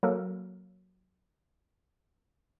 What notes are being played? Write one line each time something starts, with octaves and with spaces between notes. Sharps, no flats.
F#3 A#3 A4 A#4